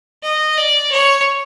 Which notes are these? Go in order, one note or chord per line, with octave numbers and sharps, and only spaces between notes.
D#5
D5
C#5